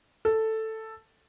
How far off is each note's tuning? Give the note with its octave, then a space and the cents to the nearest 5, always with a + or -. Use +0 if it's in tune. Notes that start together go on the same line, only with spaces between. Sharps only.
A4 +5